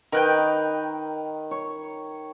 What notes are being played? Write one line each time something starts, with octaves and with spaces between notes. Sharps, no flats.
D#3 A#4 B4 G5
C#5